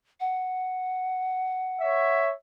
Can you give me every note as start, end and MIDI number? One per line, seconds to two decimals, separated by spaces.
0.20 2.20 78
1.81 2.32 73
1.81 2.32 76